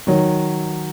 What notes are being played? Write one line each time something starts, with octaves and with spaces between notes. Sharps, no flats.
D#3 F#3